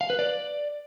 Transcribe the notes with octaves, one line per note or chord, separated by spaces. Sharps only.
F5
B4
D5